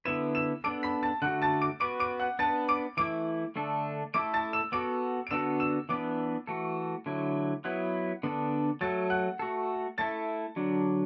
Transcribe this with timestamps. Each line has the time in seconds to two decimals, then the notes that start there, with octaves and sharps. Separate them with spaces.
0.05 D3 B3 E4 B4 E6 E7
0.35 E6 E7
0.64 B3 D4 A4 D6 D7
0.83 B5 B6
1.03 A5 A6
1.22 D3 A3 F#4 F#5 F#6
1.42 A5 A6
1.61 D6 D7
1.80 B3 F#4 B4 D6 D7
2.00 D6 D7
2.20 F#5 F#6
2.39 B3 D4 B4 A5 A6
2.68 D6 D7
2.97 E3 A3 E4 D6 D7
3.56 D3 A3 D4 A4
4.14 A3 E4 A4 D6 D7
4.34 A5 A6
4.53 E6 E7
4.72 B3 F#4 A4 D6 D7
5.27 D7
5.31 D3 B3 D4 F#4 A4 E6 E7
5.60 E6 E7
5.89 E3 B3 D4 B4 D6 D7
6.47 E3 A3 F#4 A4
7.06 D3 F#3 A3 E4
7.64 F#3 B3 E4 B4 F#5 F#6
8.23 D3 B3 D4 A4
8.81 F#3 A3 F#4 A4 A5 A6
9.10 F#5 F#6
9.39 A3 F#4 A4
9.98 A3 E4 A4 A5 A6
10.56 D3 F#3 D4